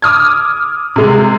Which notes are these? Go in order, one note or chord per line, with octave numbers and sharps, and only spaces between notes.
D6 D#6 F6 G#6
C3 G#3